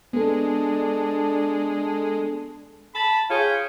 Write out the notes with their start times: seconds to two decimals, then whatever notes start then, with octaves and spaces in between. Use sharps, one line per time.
0.13 G#3 B3 D4 A4
2.95 A5 B5
3.30 F4 G#4 C#5 F5 G5